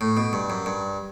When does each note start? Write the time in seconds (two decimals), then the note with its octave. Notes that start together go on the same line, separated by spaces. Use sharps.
0.01 A2
0.17 B2
0.33 G2
0.50 F#2
0.66 G2